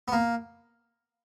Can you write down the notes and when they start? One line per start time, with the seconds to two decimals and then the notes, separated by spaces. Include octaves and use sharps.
0.08 B3
0.12 A#3